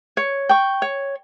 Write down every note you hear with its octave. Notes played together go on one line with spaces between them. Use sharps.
C#5
G5 C#6
C#5